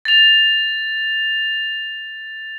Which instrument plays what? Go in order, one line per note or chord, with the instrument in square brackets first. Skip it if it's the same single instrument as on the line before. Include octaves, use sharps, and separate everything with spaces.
[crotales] A6 F7